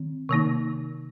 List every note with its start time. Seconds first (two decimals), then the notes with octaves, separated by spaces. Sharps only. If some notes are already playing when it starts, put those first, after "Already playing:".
Already playing: D#3 C4
0.29 C3 D#3 A#3 D#4